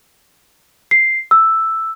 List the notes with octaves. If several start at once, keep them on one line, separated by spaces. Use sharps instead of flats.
C7
E6